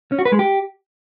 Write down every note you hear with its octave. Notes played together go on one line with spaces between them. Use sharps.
C#4
F#4
B4
G#3
G4